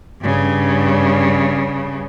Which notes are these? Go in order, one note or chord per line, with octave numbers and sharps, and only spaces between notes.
G2 C#3